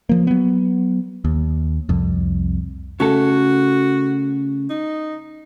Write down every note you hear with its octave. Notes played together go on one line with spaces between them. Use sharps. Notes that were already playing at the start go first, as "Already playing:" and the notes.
F3 A#3
F#3 B3
D#2
C2 F2
C#3 A3 F#4 A4
D#4